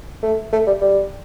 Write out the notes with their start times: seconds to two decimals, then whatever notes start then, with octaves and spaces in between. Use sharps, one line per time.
0.23 A3
0.53 A3
0.67 G3
0.81 G3